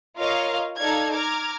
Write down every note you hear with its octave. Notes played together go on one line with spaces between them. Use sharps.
F4 A#4 C#5 D#5 F5
D#4 A4 D5 F5 G#6
A#5 D6 F6 G#6